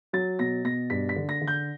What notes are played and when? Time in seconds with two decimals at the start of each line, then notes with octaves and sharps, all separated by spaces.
0.13 F#3 A6
0.39 B2 A#6
0.65 B2 A#6
0.90 G2 B6
1.09 B6
1.16 D3
1.29 A#6
1.41 D3
1.48 G6